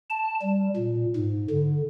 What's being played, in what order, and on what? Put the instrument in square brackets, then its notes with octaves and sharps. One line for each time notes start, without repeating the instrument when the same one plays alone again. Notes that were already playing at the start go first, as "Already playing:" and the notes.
[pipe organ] A5
G3
A#2
G#2
D3